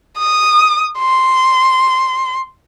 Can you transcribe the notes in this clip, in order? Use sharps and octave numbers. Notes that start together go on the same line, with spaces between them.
D#6
C6